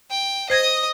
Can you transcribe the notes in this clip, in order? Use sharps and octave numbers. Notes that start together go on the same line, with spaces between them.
G5
C5 D#5 D#6 G#6 A#6